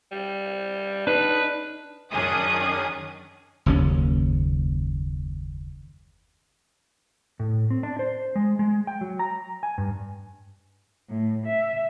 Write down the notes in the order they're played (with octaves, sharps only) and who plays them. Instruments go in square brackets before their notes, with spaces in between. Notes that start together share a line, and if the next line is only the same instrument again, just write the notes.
[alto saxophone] G3
[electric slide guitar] D4 D#4 [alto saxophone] B4
[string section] F#2 D#3 C#4 D4 G#4 D#6
[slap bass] F#1 D#2 C#4
[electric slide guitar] A2
C4
D4
C5
G#3
G#3
G5
F#3
A#5
G#5
G2
[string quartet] A2
E5